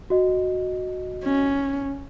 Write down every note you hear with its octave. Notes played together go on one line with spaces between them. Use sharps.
F#4 D#5
C#4